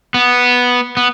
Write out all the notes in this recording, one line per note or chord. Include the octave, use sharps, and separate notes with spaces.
B3
B3